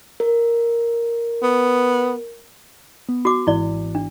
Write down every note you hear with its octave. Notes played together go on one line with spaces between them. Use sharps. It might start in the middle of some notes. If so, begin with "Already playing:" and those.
A#4
B3
B3
F#4 D6
G#1 G#2 E3 E4 D5
D4